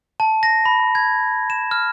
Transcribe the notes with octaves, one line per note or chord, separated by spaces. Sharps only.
A5
A#6
B5
G#6
E7
F6